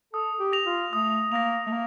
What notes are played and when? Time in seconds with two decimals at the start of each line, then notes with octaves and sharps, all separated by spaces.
0.13 A4 D#6
0.39 G4
0.53 A#6 F7
0.66 F4
0.92 A3 D#6
1.32 A#3 A#6 F7
1.66 A3
1.71 A#3